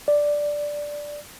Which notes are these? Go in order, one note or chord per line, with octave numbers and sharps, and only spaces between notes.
D5